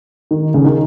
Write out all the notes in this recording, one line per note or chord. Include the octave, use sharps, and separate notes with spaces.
D#3
C#3
D#3